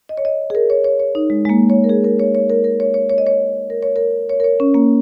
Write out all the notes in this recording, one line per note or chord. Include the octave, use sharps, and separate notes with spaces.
D#5
C#5
D#5
G#4
A#4
C#5
C#5
C#5
D#4
G#3
G#3
A#3
C#5
A#4
G#4
A#4
C#5
C#5
A#4
A#4
C#5
C#5
C#5
D#5
C#5
A#4
C#5
A#4
C#5
A#4
C#5
C#4
A#3